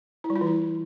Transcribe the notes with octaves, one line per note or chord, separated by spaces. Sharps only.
E4
G3
F4
E3
E4